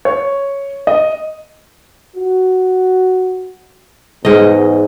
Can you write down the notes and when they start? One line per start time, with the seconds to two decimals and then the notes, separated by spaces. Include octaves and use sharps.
0.05 C#5
0.87 D#5
2.16 F#4
4.25 E2 G#2 D#5